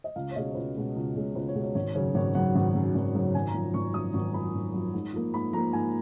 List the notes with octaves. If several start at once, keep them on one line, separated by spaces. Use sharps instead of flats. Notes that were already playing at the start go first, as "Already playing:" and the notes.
D#5
C#2 F5
C#5
B2 G#3 C#4 D#5
C#5
C#2 B4
B2 G#3 C#4 B4
C#2
B2 G#3 C#4
C#2 B4
C#5
B2 G#3 C#4
C#5
G#1 C#5
F#2 C#3 F#3 C#4 C#5
G#1 C#5
F#2 C#3 F#3 C#4 F#5
G#1
F#2 C#3 F#3 C#4
G#1
F#2 C#3 F#3 C#4
G#1 G#5
A#5
F#2 F3
G#1 C#6
F#2 F3 D#6
G#1 C#6
F#2 F3 B5
G#1
F#2 F3
G#2
F3 A#3
G#2 B5
F3 A#3 A#5
G#2 G#5